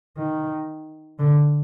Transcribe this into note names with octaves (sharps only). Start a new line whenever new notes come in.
D#3
D3